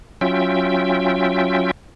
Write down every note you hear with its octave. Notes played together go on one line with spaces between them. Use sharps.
F#3 C#4 F4 E5 G5